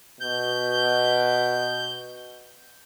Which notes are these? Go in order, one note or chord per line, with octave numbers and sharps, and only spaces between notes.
B2 G6